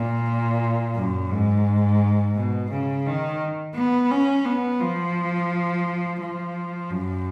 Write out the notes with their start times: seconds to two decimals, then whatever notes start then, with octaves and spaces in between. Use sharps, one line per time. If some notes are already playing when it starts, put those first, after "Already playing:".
Already playing: A#2
0.95 F#2
1.31 G#2
2.36 B2
2.70 C#3
3.06 D#3
3.75 B3
4.11 C#4
4.46 B3
4.80 F3
6.20 F3
6.90 F#2